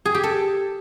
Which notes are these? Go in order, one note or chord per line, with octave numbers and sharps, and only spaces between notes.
G#4
G4
A4